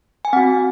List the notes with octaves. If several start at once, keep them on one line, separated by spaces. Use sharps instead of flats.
G#5
C4 F#4 F#5